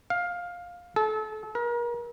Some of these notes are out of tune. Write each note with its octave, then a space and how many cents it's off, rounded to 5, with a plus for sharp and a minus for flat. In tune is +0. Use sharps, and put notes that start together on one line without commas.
F5 +15
A4 -30
A#4 +35